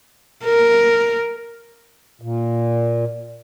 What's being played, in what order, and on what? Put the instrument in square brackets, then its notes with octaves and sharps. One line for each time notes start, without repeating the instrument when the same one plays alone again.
[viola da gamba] A#4
[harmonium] A#2